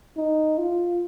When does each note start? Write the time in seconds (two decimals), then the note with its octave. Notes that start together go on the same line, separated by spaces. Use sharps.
0.17 D#4
0.58 F4